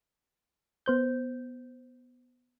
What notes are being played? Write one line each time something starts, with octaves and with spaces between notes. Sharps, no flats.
B3 C5 G6